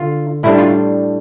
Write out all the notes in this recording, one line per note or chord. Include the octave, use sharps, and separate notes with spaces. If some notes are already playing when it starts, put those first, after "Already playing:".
Already playing: D3 F4
A2 G3 D4 E4
F4